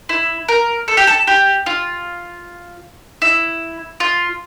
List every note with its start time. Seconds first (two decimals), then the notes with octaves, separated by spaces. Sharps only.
0.09 E4
0.48 A#4
0.88 A4
0.97 G4
1.07 A4
1.27 G4
1.66 F4
3.22 E4
4.00 F4